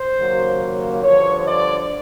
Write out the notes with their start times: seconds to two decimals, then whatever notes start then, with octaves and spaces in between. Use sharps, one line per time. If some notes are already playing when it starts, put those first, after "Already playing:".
Already playing: C5
0.16 D#2 C#3 F#3 A#3
1.02 G2 D3 F3 C#5
1.46 D5